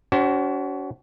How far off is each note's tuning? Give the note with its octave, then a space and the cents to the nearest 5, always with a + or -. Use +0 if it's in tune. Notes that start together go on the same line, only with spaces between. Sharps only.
C#4 +45 F#4 +30 C5 +10